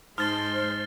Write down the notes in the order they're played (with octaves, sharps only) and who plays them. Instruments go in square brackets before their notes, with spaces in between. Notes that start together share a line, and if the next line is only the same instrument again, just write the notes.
[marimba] G#2 D#4 A5 [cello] G#3 [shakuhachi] C5 [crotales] F6 A6 G7